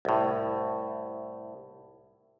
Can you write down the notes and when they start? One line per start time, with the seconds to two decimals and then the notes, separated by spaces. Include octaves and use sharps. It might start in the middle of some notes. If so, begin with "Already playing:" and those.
0.05 C2 A2